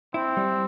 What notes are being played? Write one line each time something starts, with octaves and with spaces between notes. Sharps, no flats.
C4 E4
G3